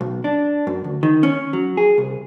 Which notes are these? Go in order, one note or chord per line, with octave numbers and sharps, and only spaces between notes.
B1
D4
F#2
D2
D#3
C#4
F#3
G#4
C2